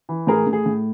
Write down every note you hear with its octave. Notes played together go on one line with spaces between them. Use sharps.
E3
A2 G#4 A#4
A2
G#4
A2